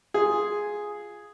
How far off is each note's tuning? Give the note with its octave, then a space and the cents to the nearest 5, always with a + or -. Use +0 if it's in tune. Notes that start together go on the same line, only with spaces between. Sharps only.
F4 +0 G#4 +0